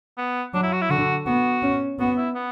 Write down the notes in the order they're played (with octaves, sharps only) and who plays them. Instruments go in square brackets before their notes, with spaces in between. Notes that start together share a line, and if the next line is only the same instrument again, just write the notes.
[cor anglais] B3
[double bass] F#3 [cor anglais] D4
[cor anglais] E4
F#4
E4
[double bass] D3 [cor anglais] F#4
[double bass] B3 [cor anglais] F#4
[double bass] C#4
[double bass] B3 [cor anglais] F#4
[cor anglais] E4
B3